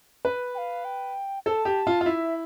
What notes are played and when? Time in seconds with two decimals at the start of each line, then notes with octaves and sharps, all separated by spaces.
0.25 B4
0.55 G5
0.58 F5
0.85 G5
1.46 A4 A5
1.65 G4
1.87 F4
2.01 F4
2.06 E4 E5